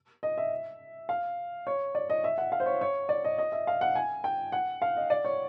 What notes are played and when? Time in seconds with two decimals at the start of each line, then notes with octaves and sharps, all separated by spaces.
0.23 D#5
0.38 E5
1.09 F5
1.67 C#5
1.95 D5
2.10 D#5
2.24 E5
2.38 F#5
2.52 F5
2.60 C5
2.66 C#5
2.81 C#5
3.09 D5
3.24 D#5
3.38 D#5
3.52 E5
3.67 F5
3.81 F#5
3.95 G#5
4.24 G5
4.52 F#5
4.82 F5
4.97 D#5
5.10 D5
5.25 C#5